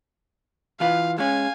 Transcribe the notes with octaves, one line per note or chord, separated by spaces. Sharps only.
E3 F4 B4 F5
G#3 C#4 F5 G#5